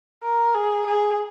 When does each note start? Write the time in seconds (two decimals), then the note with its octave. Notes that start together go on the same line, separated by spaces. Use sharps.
0.23 A#4
0.54 G#4
0.86 G#4